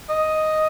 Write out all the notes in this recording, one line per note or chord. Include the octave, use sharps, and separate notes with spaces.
D#5